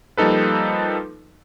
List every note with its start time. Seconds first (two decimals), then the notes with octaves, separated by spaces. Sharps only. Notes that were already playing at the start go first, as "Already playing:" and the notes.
0.17 F3 G3 A#3 D#4 A4 B4